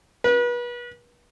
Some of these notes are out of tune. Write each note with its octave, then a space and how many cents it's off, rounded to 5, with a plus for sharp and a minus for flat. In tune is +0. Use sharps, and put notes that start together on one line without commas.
B4 -35